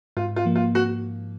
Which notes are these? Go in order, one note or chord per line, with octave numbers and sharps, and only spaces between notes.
G#2 F4
F4
F3 A#3
F4
F#4